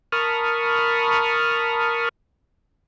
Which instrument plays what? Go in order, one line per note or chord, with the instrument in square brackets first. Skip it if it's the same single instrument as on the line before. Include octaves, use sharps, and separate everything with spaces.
[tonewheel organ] A#4 A5 B5 C#6 D#6 F6